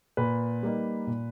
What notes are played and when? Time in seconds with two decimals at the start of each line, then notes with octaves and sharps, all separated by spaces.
0.17 A#2 B4
0.63 G3 A#3 D#4
1.07 A#2